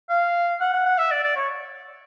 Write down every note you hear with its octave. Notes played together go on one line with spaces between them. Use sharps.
F5
F#5
F#5
F#5
E5
D5
D5
C#5